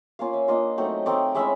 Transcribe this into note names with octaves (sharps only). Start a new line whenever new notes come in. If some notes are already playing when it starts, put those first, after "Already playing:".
A#3 C#4 F4 F5
E5
A#3 D4 F4 D#5
F#3 A3 C4 D#4
A3 C4 D#4 D5
G#3 C#4 E4 E5